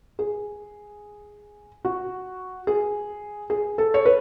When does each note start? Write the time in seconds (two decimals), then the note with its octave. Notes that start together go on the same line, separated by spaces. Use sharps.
0.19 G#4
1.85 F#4
2.67 G#4
3.50 G#4
3.78 A4
3.94 C#5
4.05 B4